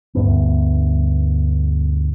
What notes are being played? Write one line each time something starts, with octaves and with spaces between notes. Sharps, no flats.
D2 G2 B3